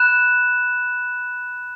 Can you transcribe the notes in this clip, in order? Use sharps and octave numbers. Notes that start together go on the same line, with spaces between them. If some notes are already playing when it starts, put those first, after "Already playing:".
Already playing: B5 F#6 E7